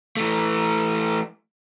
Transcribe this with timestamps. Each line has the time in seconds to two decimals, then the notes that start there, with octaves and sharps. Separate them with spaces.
0.17 E3 A3